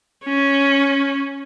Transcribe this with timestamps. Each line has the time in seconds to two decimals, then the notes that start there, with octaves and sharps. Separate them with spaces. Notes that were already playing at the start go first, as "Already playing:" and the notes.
0.24 C#4